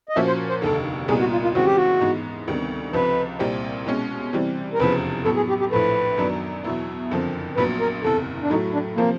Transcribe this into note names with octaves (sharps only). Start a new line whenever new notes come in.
D#5
A#2 F3 A#3 C#4 F#4 E5
C5
C5
F1 D#2 D3 A4
C2 A#2 G3 B3 D#4 G#4
F#4
F4
F4
D#2 C#3 E3 G#3 C4 F#4
G4
F#4
G#2 E3 G#3 B3
D2 C3 D#3 G3 B3
C#2 C3 F3 B4
C2 A#2 G3 C4
B2 G#3 C#4
C3 E3 G3 C4
A#4
F1 E2 C#3 F3 B4
A2 F#3 B3 A4
G#4
G4
G4
A#1 A2 F3 A3 B4
F#2 D#3 F#3 B3 D4
E2 B2 F#3 B3 E4
F#1 F2 D3 F3
A#1 A#2 F#3 B3 B4
A#4
F#1 E2 C3 A4
D4
A2 F#3 A3 D#4
D4
C3 F3 A#3